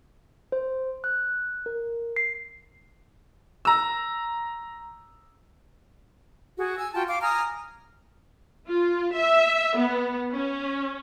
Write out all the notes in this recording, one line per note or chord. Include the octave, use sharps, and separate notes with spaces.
C5
F#6
A#4
C7
A#5 E6
F#4 G#4
G#5 E6
F4 F#4 G5 A5
F5 D6
G#5 A#5 D#6 F6
F4
E5
B3
C#4